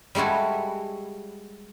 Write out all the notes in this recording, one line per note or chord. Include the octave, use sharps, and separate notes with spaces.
G3 G#3 E4 F#4 A4